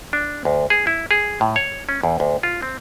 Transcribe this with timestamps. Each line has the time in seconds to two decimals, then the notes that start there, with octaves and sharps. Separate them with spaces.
0.13 D4
0.45 D2
0.70 G#4
0.87 E4
1.11 G#4
1.41 A2
1.56 C#5
1.89 C#4
2.03 E2
2.20 D2
2.43 F4
2.62 C4